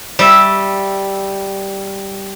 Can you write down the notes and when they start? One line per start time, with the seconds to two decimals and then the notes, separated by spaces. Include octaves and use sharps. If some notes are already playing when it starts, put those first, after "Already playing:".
0.19 G3 E5